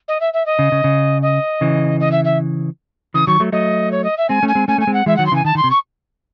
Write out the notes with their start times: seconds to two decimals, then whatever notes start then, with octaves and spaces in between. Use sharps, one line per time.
0.08 D#5
0.20 E5
0.33 E5
0.46 D#5
0.59 C#3
0.72 C#3
0.84 C#3
1.22 D#5
1.61 C#3 E3
2.00 D#5
2.12 E5
2.24 E5
3.14 C#3 E3 D#6
3.27 D#3 F#3 C#6
3.40 F#3 A3
3.52 F#3 A3 D#5
3.91 C#5
4.04 D#5
4.17 E5
4.29 G#3 C4 G#5
4.43 A3 C#4
4.48 G#5
4.55 G#3 C4
4.68 A3 C#4 G#5
4.78 A3 G#5
4.87 G#3 C4
4.93 F#5
5.06 E3 G#3 E5
5.16 D#3 F#3 F#5
5.26 C6
5.32 C#3 E3 G#5
5.45 D#3 A5
5.55 D#3 C6
5.64 C3
5.71 C#6